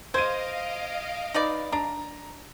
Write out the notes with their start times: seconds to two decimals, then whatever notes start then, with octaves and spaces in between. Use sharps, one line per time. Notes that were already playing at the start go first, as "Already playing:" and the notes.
0.14 C5 D#5 F5 G#6 D7 D#7
1.34 D#4 B4 D5
1.72 D4 A#5